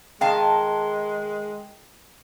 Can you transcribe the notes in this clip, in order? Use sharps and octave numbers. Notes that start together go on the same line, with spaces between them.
D#3 G#3 F5 G5 A5